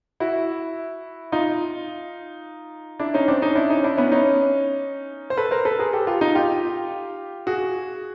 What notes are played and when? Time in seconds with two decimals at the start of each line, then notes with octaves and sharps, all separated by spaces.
0.20 E4 F#4
1.32 D#4 F4
2.99 D4 E4
3.14 C#4 D#4
3.28 C4 D4
3.42 C#4 D#4
3.55 D4 E4
3.70 C#4 D#4
3.84 D4 E4
3.97 B3 C#4
4.12 C#4 D#4
5.30 C5
5.37 A4 B4
5.51 A#4 C5
5.65 A4 B4
5.79 G#4 A#4
5.93 G4 A4
6.07 F4 G4
6.21 D#4 F4
6.35 F4 G4
7.47 F#4 G#4